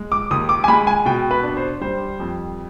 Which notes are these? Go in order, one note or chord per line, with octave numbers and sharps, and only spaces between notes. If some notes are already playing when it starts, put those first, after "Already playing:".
Already playing: G#3
D6
D#2 D#6
D6
G#5
G#3 B5
G#5
B2 G5
B4
D4
C5
G3 C5
F2